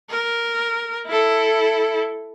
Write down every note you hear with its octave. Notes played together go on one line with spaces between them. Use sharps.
A#4
E4 A4